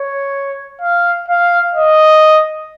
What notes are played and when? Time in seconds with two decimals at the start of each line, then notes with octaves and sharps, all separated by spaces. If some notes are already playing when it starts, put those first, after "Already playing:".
Already playing: C#5
0.81 F5
1.28 F5
1.75 D#5